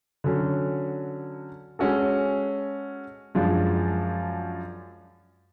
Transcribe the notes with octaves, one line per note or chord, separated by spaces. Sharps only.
D3 F#3 C#4
G#3 C#4 F#4 A4
F#2 F3 G#3 D4